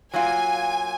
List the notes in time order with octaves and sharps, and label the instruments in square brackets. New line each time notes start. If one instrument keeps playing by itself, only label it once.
[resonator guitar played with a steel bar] F#3 A#3 F4 [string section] G#5